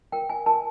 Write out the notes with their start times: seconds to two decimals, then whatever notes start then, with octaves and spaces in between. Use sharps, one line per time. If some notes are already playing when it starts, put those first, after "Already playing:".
0.12 A#4 G5
0.30 G#5
0.46 A#4 A5